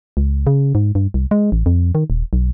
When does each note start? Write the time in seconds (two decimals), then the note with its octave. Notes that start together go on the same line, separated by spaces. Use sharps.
0.17 C#2
0.47 C#3
0.75 G#2
0.95 G2
1.14 C2
1.31 G#3
1.52 A1
1.66 F2
1.95 D#3
2.10 D#1
2.33 B1